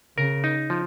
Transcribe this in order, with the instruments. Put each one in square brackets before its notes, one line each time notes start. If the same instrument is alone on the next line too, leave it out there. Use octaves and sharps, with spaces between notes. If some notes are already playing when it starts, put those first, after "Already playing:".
[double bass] C#3 [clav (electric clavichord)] A#4
[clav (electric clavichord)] D#4
F3